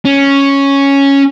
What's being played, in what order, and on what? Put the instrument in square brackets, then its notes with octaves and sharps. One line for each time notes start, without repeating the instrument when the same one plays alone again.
[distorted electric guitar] C#4